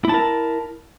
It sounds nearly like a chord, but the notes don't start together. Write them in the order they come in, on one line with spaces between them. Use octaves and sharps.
E4 A5 A#4